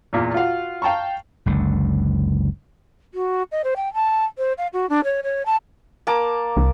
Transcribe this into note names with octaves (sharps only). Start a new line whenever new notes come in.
E2 A#2 F4
F4 F#4 F5 F#5
F5 G5 A5 A#5 C#6
F#1 C#2 D3
F#4
D#5
C5
G5
A5
C5
F5
F#4
D4
C#5
C#5
A5
A#3 A5 D6
C2